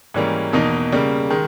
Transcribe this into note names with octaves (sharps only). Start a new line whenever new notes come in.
G#2 E3 G3 A#3 C#4
E2 B2 A#3 D#4
C#3 G3 A#3
D#3 G#3